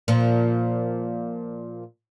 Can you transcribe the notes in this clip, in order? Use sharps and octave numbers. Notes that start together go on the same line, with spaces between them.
A#2 F3